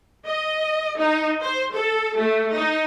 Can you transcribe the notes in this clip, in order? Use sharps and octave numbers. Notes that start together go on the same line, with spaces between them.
D#5
D#4
C5
A4
A3
D#4